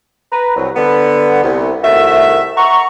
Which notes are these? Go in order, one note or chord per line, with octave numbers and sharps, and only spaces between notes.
B4 A#5
C2 F#3
D3 B3
C2
C2 D#3 A3 F#4 E5
F#5 A#5 C#6